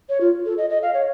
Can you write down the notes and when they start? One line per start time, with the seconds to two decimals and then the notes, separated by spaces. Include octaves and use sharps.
0.09 C#5
0.21 F4
0.46 A4
0.58 D#5
0.70 D#5
0.82 F5
0.94 C#5